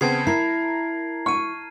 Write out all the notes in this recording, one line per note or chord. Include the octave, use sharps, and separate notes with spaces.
C#3 B3 C4 A5 G#6 C7
E4 A#4 G#6 C7
C#6 F6 D#7